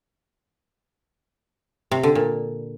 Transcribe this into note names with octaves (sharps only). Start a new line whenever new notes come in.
C3
D3
A#2